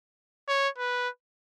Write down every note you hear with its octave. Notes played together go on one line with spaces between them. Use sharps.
C#5
B4